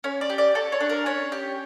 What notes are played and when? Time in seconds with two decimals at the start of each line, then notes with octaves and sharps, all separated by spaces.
0.04 C#4 C#5
0.21 D5
0.30 G4
0.38 D5
0.55 A4 C#5
0.72 C#5
0.80 D4
0.89 A#4
1.06 C#4 C#5
1.32 G4